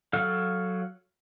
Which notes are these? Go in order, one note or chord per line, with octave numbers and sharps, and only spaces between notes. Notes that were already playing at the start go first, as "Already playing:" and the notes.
F#3 A4 F5 F6